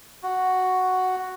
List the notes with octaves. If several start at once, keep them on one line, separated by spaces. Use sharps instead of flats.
F#4